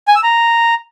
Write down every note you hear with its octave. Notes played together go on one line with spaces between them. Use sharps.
G#5
E6
A#5